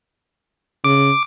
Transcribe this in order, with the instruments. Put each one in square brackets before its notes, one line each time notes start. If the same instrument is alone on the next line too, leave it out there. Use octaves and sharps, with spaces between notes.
[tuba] C#3 [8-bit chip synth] D6